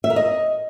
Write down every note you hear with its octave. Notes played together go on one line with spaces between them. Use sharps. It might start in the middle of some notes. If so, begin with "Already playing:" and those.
E5
A#4
D#5